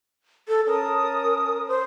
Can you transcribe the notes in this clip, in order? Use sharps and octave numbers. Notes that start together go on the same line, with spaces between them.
A4
C#4 A#4 A5 D#6
C5